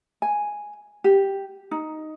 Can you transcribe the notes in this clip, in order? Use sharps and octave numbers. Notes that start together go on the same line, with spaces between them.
G#5
G4
D#4